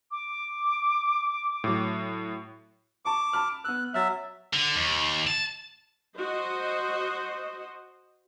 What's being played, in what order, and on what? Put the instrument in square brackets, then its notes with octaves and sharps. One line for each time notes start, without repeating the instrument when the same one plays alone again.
[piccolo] D6
[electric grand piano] A2 F#3
[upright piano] A5 C#6 [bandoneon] D6
[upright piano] A5 B5 F6
[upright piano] B3 E6 [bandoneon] F#6
[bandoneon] F#3 E5 [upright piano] F6 A6
[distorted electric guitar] D3
D#2
A5
[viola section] F#4 C5 D#5